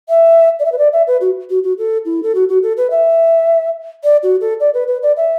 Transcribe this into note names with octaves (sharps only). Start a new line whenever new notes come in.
E5
D5
E5
B4
D5
E5
B4
F#4
F#4
F#4
A4
E4
A4
F#4
F#4
A4
B4
E5
D5
F#4
A4
D5
B4
B4
D5
E5